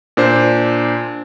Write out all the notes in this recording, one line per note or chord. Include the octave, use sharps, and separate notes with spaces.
A#2 D4 C5